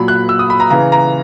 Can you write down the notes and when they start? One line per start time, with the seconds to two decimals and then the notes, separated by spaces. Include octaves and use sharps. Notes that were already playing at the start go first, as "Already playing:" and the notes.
Already playing: A#2 F#3 B5
0.08 F#6
0.29 E6
0.39 D#6
0.50 B5
0.60 A#5
0.70 C#3 E3 A#5
0.92 A#5